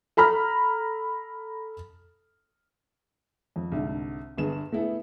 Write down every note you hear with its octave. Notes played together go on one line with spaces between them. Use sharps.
A4 A#5 B5 F6
F2
C2 G#2 D3
G1 G2 B3 G#4 E7
A3 B3 E4 G#4 A4